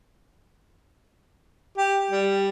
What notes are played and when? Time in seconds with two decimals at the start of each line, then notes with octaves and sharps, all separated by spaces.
1.78 G4
2.11 G3